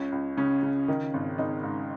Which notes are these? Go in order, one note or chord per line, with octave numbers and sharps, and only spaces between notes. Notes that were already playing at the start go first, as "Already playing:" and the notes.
Already playing: C#2 C#4
C#2
C#3 C#4
C#3
D#3
G#1
G#1 D#4
G#2